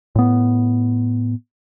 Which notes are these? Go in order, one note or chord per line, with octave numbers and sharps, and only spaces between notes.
A2 B3